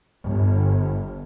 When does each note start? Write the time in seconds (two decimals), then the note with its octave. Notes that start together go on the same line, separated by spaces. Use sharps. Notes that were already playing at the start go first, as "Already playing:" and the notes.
0.23 G1